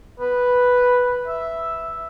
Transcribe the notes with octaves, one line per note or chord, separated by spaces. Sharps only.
B4
E5